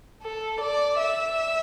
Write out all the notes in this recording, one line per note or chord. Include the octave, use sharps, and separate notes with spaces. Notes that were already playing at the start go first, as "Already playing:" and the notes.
A4
D5
E5